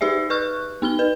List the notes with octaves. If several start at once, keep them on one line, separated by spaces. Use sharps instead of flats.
D#4 G4 G#4 D5 E5
B4 C#6 F6 F#6
B3 D#4 F6 G7
B4